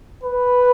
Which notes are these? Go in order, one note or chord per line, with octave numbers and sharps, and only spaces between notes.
B4